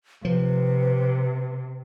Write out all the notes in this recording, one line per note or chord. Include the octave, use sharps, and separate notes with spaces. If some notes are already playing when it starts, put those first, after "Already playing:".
C3 F3 B4